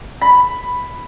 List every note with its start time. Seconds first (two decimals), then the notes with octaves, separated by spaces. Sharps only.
0.21 B5